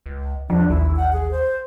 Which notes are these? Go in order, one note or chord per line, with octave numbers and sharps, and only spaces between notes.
C#2
E2 F3 D4
A1 D#2 E4
F#5
G#4
C5